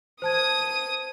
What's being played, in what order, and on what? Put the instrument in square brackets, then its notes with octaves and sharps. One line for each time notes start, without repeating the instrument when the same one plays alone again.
[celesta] C5 A5 G#6 [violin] D#6 D#7